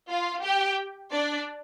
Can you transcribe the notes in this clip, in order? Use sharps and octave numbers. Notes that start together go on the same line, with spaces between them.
F4 F5
G4 G5
D4 D5